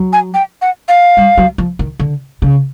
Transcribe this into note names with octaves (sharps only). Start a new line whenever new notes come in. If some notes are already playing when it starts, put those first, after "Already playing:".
Already playing: F#3
G#5
G5
F#5
F5
G3
F#3
F3
D#3
D3
C#3